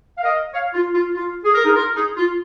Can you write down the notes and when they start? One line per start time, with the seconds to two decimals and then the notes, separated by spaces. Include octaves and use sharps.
0.18 F5
0.23 A#4 D#5
0.53 C#5 F5
0.74 F4
0.95 F4
1.14 F4
1.45 G#4
1.55 A#4
1.64 D#4 G#4
1.75 F4 A#4
1.96 D#4 G#4
2.17 F4